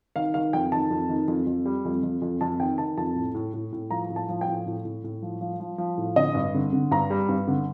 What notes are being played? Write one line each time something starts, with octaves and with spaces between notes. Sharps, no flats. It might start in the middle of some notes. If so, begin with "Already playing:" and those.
D#3 F5
D#3 F5
F2 G5
D#3 A5
F2
D#3
F2
F2
G3
F2
F2
F2
F2 A5
D#3 G5
D#3 A5
F2 A5
A2
A2
A2
A2
F3 A#5
A2
A5
F3
G5
A2
A2
A2
A2
F3
F3
F3
F3
A2
D3 D#5
G2
D3
D3
G2 A#5
G3
G2
D3